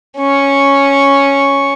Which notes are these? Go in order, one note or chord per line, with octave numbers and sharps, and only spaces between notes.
C#4 C#6